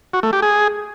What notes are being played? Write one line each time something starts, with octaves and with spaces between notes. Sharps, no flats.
F#4
A3
G4
G#4